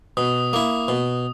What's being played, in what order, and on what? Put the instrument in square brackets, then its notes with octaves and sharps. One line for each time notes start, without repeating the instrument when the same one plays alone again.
[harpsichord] B2 [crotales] D#6
[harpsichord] A#3 E4
B2